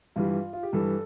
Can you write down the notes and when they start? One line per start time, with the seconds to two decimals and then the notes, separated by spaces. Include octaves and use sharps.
0.16 G2 E3 G3 F4
0.53 F4
0.63 G4
0.73 G2 E3 G3 A4